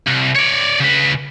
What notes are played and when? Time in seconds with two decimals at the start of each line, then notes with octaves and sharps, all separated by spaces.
0.08 C2
0.35 C#5 D5
0.80 C#3 B4